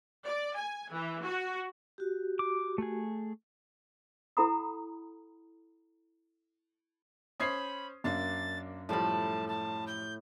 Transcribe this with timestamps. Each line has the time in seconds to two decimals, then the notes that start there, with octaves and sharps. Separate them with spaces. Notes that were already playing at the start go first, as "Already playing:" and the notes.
0.25 D5
0.56 G#5
0.92 E3
1.24 F#4
1.98 F#4 G4
2.39 D6
2.78 A3 G#4
4.37 E4 A4 F#5 A#5 B5 D#6
7.40 C#4 C5 B5 D#6 G#6 C7
8.04 F#2 A#3 D4 A6
8.89 A2 F3 G3 A3 A5 B5
9.48 A5
9.87 G6